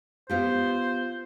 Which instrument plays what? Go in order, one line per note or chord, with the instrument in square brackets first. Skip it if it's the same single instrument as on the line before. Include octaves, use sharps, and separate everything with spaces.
[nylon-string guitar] B3 F4 G4 [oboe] C5